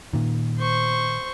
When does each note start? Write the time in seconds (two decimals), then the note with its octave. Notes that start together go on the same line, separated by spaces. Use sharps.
0.13 A#2 D#3
0.58 C5 C#6